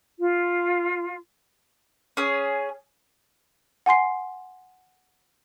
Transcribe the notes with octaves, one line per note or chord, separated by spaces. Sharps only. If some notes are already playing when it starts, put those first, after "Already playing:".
F4
C#4 G#4
F#5 G#5 C6 C7